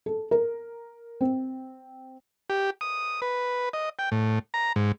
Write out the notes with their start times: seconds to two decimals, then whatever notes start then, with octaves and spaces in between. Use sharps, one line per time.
0.06 A4
0.31 A#4
1.21 C4
2.50 G4
2.81 D#6
3.22 B4
3.73 D#5
3.99 G5
4.12 A2
4.54 A#5
4.76 G#2